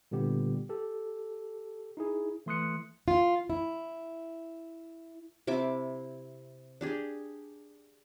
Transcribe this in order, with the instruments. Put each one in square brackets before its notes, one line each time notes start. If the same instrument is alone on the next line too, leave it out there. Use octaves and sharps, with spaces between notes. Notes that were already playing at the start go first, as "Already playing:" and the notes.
[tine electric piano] A#2 D3 G3 B3 G4
G4 A4
D#4 E4 G#4
E3 A3 C6 D#6 F#6 C#7
[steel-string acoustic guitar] F4
E4
[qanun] C3 E4 E5 D6
D4 G4 G#4